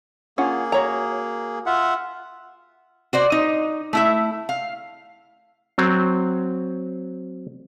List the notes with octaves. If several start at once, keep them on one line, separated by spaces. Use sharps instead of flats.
A#3 C#4 F4 G#4 F#5
F#4 C#5 A#5
F4 E5 F#5
F#4 C5 D5
D#4
A3 E4 E5
F5
F#3 C4